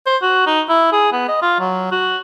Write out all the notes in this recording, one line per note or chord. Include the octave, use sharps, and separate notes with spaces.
C5
F#4
D#4
E4
G#4
B3
D#5
F4
F#3
F#4